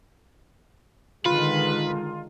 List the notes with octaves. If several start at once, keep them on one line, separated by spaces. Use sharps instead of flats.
D3 D#3 G#3 F4 B4